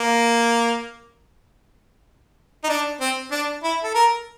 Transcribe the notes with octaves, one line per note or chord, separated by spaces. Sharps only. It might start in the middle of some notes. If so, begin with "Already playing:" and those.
Already playing: A#3
D#4
D4
C4
D4
E4
A4
A#4